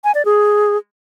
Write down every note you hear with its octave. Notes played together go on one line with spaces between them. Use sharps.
G#5
D5
G#4